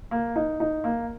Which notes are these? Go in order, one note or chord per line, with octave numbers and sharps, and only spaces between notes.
A#3
D#4
D#4
A#3